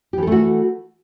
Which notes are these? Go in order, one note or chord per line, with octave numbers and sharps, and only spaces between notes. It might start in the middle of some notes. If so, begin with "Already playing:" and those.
E3 A3 F#4 G4 A4